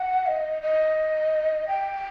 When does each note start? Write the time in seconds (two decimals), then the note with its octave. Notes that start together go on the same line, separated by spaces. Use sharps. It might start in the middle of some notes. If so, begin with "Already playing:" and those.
Already playing: F#5
0.27 D#5
0.62 D#5
1.68 G5